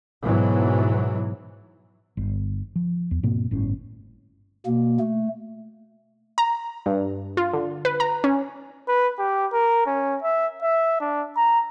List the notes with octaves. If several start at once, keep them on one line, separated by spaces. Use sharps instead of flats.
G#2 B2 E3 F#3
G1
F3
E2
G#2 B2 A#3 C4
G1 A2 C#4
B2 A#3
A3
A#5
G2
F4
D3
B4
A#5
C#4
B4
G4
A#4
C#4
E5
E5
D4
A#5